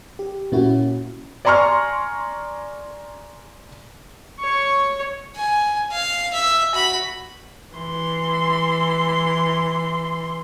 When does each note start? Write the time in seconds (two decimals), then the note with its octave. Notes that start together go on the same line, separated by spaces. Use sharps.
0.19 G4
0.52 A#2 A#3 C#4 E4 F#4
1.45 D5 G#5 A#5 C6 C#6 F6
4.39 C#5 C#6
5.36 G#5
5.92 F5
6.33 E5
6.73 F#4 B5
7.76 E3 C6